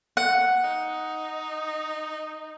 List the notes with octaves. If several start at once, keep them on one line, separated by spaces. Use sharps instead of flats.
F#5
D#4